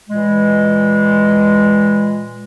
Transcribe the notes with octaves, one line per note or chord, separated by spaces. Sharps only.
A#2 E3 G#3